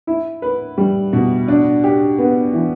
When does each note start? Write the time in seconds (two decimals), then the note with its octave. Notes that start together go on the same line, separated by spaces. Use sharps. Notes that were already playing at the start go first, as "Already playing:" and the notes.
0.07 E4
0.42 B4
0.78 G3
1.13 B2
1.48 D4
1.84 G4
2.19 B3
2.53 E3